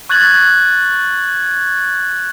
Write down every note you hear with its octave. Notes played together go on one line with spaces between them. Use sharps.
C#6 F#6 G#6 A6 F#7